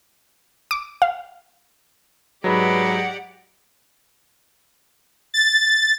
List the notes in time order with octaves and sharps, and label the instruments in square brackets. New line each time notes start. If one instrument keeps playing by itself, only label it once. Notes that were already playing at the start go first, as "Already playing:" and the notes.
[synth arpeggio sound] D6
F5
[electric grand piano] G#2 F#3 [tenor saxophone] G#3 [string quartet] G4 D5 F#5 [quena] B4
[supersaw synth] A6